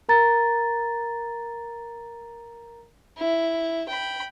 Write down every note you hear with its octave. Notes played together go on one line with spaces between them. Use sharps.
A#4 A#5 A6
E4
G5 B5